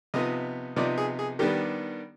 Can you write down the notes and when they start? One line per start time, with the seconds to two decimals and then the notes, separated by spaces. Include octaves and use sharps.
0.14 C3 F3 B3 D#4 D#5
0.76 C3 F3 B3 D#4 D5
0.98 G#4
1.19 G#4
1.39 D#3 G3 B3 D4 G4